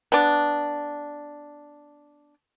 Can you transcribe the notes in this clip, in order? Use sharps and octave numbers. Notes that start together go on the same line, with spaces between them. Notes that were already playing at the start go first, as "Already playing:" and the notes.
B3 D4